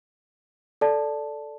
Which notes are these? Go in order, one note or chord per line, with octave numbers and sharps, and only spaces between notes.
A4 D5 A5